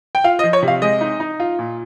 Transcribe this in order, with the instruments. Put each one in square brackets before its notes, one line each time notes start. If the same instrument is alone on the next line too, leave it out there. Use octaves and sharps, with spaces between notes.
[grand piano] G5
F4 F5
D#5
F3
C#5
C3
F5
G#3 D#5
D#4
D#4
F4
A#2